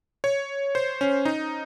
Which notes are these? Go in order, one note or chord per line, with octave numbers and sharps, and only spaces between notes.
C#5
C5
C#4
D#4